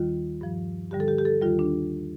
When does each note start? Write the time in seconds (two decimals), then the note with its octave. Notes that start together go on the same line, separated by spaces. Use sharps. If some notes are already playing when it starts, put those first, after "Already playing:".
Already playing: D#2 D#3 G3 F4
0.41 G2 F3
0.91 G2 D3 G3 G4
1.00 A4
1.08 G4
1.18 G4
1.25 A4
1.42 D#2 D#3 G3 F4
1.59 D4